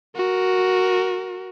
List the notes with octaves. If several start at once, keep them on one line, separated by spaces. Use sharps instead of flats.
F#4 A#4